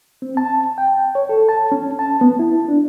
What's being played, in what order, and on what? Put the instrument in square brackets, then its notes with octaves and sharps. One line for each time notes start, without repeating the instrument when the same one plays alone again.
[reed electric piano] C4
A5
G5
C#5
A4
A5
C#4
A5
B3
E4
D4